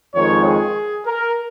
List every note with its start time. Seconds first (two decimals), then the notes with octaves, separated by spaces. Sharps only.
0.13 F2 D#3 G#3 C#5
0.44 G#4
1.06 A#4